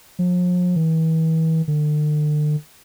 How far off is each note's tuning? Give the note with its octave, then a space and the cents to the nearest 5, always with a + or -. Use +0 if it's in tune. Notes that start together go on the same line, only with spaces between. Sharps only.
F3 +40
E3 -40
D3 +40